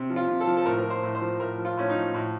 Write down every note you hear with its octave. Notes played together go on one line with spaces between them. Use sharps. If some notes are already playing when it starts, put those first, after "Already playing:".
Already playing: C3
F3
F4
C3
A4
F3
A4
A2 A#4
A#4
F3
C5
A2
C5
F3
A2 A#4
F3
F4
A2 C#4
D#4
F3
A2